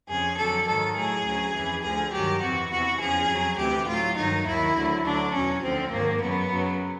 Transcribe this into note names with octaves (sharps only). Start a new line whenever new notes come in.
F2 C#3 F3 G#4
F2 D3 F#3 A4
G#2 D#3 F#3 A4
A2 F#3 G#4
D2 C#3 F#3
F2 C#3 E3
D2 D3 F3 G#4
G2 D#3 F#3 G4
F2 C3 E3 F#4
E2 C3 E3 F#4
E2 C#3 F3 G#4
F2 C#3 F#3
D2 C3 E3 G4
A2 F#3 F4
G2 D#3 F#3 D#4
D#2 D#3 F#3 E4
D2 D3 F#3
D2 D3 F#3 D4
E2 B2 F#3 C#4
D2 D3 F3 C4
G#2 D#3 F#3 A#3
F#2 C#3 F#3 B3
F#2 C#3 F#3